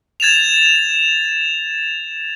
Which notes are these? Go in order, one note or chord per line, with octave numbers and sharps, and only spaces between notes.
G#6 A6 E7 F7